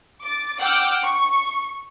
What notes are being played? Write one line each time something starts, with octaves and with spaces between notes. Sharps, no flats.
D6 A6
F#5 G5 D6 E6 F6 G6
C#6